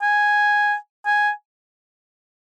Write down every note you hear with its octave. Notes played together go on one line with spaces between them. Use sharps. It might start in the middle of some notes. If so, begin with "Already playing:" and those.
G#5
G#5